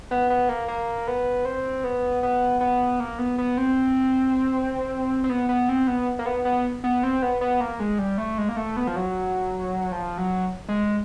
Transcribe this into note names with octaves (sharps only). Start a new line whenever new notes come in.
B3
B3
A#3
A#3
B3
C4
B3
B3
B3
A#3
B3
B3
C4
C4
B3
B3
C4
B3
A#3
B3
B3
B3
C4
B3
B3
A#3
G#3
G3
A3
G#3
A#3
A3
B3
F3
F#3
F3
F#3
G#3